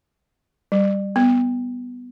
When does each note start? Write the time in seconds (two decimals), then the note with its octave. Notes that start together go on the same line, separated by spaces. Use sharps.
0.72 G3
1.16 B3